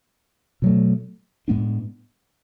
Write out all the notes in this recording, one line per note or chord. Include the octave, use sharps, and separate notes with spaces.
B2 F#3 A3
A2 G#3 B3 D4